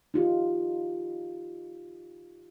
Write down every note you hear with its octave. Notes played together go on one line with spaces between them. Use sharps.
D#4 F4 G4